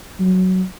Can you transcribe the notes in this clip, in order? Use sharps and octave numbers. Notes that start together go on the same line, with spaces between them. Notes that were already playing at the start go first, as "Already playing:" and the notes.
F#3